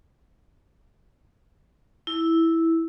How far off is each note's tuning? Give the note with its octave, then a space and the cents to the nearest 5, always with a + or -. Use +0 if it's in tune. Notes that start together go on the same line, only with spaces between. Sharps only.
E4 -5